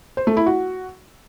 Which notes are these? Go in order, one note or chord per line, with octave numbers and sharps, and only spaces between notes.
C5
A3
E4
F#4